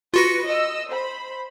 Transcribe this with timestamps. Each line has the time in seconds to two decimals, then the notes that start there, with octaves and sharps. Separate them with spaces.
0.14 F4 F#4 B4 A#6 C#7
0.47 D#5 E6
0.91 C5 B5